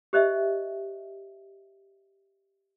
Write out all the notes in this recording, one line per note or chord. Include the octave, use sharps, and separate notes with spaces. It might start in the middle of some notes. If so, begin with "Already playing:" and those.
G4 C5 D#5 E5